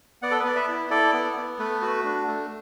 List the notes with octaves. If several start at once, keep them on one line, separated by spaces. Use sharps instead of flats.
B3 D5 F#5
A4
B4
B3 D5
B4 E5
E4
E4 A4 D5
B3
B3
A3 B4
F#4
D4
A3